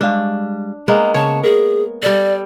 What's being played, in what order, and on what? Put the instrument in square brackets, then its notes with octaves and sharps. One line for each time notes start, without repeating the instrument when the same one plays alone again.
[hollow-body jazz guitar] G3 G#3 F5 [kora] D4
[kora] G#3 A#3 B3 [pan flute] A#5
[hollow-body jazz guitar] C#3 [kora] C#5 [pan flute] A5
[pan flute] G#4 [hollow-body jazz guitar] A#4
[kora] G3 A4 [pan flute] D5